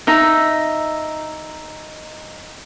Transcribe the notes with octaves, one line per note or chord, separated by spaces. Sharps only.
D#4 E5